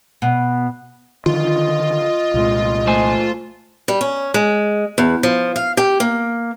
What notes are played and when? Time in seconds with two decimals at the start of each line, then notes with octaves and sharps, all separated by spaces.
0.22 B2
1.26 D3 D#3 F3 F4 D#5
2.34 C2 A#2 G#3
2.87 A3 C5 G#5
3.88 G3
4.01 C#4
4.34 G#3
4.98 E2
5.23 F3
5.56 F5
5.77 G4
6.00 A#3